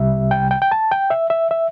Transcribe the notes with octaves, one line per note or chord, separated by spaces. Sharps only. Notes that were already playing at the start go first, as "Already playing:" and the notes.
Already playing: C2 C3 G3 E5
G5
G5
G5
A5
G5
E5
E5
E5